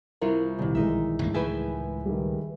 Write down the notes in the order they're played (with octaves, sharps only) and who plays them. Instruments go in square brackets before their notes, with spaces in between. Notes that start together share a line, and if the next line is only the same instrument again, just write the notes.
[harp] C2 [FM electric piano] E4 F4 A#4
[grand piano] C2 [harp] A#2 D#3
[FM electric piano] B1 [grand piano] E3 G#3 [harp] D#4 E5
[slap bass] C#2 G2 A#3 [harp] A3
[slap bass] C#2 A2 F3 [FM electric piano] G#4 B4 [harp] E5 G5 G#5
[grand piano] D#3 G3